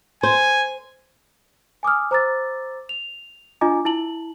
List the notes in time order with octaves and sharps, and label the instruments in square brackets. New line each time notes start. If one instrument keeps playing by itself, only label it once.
[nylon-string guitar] C5 [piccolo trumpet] G#5
[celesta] G#5 D6 D#6 F6
C5 A#5 D6 E6 A6
F7
D4 F4 D#5 G#5 A#5 D6
E4 A5 F#7